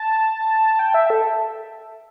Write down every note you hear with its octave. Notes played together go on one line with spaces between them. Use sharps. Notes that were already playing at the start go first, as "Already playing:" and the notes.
Already playing: A5
G5
E5
A4